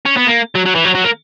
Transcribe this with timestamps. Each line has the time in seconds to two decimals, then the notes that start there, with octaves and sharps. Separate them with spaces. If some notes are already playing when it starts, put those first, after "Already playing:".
0.05 C#4
0.17 B3
0.27 A#3
0.55 F#3
0.65 F#3
0.75 E3
0.84 F#3
0.95 F#3
1.04 A#3